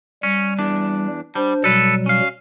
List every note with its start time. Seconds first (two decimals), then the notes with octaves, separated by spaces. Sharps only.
0.23 G3 C#4
0.58 E2 D4
1.35 G3 D4 C5
1.64 B2 F#3 G3 A4 B4
2.06 C#4 F5